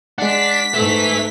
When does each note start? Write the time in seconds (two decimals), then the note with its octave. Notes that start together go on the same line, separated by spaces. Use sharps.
0.18 G#3 D4 F#5 B6
0.74 G#2 A3 B4 E5